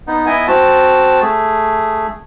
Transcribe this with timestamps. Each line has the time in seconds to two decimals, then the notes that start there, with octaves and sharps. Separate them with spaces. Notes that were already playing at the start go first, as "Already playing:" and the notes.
0.07 B3 D#4
0.26 B3 E4 D#5 G#5
0.48 C4 F#4 A5
1.22 A3 G#4